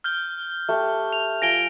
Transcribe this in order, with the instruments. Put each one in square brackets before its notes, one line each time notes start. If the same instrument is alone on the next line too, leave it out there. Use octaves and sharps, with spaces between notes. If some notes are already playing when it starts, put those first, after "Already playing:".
[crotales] F6 G6 G7
[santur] A3 G4
[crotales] F7
[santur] F3 G#5 [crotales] A#6 D7 G7